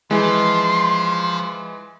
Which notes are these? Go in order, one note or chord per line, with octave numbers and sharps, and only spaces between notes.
E3 F3 G#3 C6